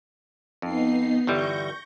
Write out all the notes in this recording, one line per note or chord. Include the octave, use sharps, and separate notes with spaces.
F2 B3 D#4 C7
G1 E3 G3 C#6 G6 A#6